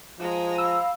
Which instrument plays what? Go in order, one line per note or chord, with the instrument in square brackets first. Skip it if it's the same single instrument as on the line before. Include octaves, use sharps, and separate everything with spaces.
[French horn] F3 [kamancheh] G#3 A#5
[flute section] F5 B5 [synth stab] E6